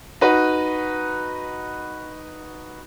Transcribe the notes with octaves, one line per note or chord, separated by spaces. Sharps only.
D#4 F#4 B4